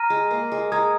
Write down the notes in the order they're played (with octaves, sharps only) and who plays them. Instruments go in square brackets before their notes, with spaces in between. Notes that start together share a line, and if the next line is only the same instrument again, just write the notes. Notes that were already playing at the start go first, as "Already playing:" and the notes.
Already playing: [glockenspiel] A#5 F6 A#6 D#7
[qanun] G#3
A#3
G#3
[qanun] G#3 [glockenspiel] A#5 D#6 G#6